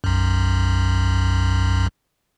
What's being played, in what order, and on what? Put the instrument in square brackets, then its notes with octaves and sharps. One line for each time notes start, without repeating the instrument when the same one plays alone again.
[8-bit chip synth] B1 F#2